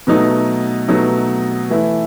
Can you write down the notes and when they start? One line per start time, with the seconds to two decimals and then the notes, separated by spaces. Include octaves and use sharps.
0.07 B2 F#3 A3 D#4
0.88 B2 F#3 A3 D#4
1.70 E3 A3 E4